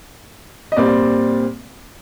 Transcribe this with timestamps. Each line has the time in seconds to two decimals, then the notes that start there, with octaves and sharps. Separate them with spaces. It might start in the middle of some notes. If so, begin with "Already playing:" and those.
0.72 D#5
0.76 A#2 G3 C4 D5